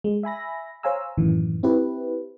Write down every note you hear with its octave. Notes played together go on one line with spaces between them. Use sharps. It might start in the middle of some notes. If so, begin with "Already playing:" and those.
G#3
E5 G#5 B5 A#6
C5 C#5 F5 G#5 A#5 E6
F#2 A2 D#3 E3
C4 E4 G4 B4